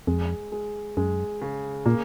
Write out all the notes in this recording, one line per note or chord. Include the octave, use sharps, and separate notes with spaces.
F2 G#3
G#3
F#2 G#3
C#3
A#2 A#3